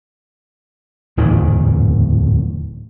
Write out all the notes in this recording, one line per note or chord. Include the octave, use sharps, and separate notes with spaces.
D1 E2 G#2 D#3